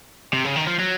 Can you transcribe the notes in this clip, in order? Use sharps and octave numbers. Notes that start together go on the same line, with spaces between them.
C3
C#3
D#3
F3
F#3